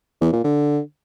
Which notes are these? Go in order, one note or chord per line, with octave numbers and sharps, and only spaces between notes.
E2
A#2
D3